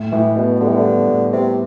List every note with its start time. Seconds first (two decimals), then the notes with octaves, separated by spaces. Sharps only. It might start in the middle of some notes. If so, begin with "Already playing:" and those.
Already playing: A2
0.12 A2 E3
0.36 B2 B3
0.60 D3 G3
0.68 E3
0.76 D3
0.85 B3
1.09 A2
1.33 C3 B3